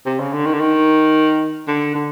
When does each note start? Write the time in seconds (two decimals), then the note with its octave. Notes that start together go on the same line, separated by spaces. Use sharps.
0.06 C3
0.20 C#3
0.33 D3
0.46 D#3
0.53 D3
0.60 D#3
1.68 D3
1.95 D3